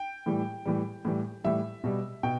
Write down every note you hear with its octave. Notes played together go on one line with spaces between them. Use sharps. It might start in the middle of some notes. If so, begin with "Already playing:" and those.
Already playing: G5
A2 E3 G3
A2 E3 G3
A2 E3 G3
A2 E3 G3 E5
B2 G3
B2 G5